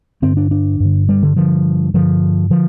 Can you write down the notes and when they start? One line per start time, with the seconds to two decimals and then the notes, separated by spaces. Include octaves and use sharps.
0.22 G2 D3 C4
0.37 D4
0.51 D4
0.80 G2 D3
1.09 G3
1.23 D3
1.36 G2 D3 F3
1.94 G2 D3 F3
2.50 D3 F3